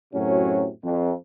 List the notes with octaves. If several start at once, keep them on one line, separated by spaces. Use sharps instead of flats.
F#2 A2 C3 F#3 C#4
F2